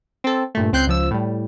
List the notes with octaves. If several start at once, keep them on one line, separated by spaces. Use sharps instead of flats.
C4 A4
G2 A#2 A3
C#2 C4 F#6 G6 C7
C#2 F3 E6
A2 G3